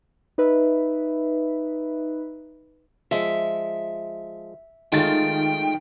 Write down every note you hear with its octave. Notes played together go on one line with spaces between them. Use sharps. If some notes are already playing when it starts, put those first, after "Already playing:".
D#4 B4 E5
F3 G#3 E5
D#3 G#3 A3 F4 G5 A6